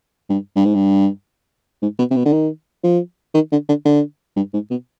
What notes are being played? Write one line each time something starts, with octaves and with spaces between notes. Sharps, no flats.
G2
G2
G#2
G2
G#2
B2
C3
B2
D3
D#3
F3
D#3
D3
D3
D3
G2
G#2
B2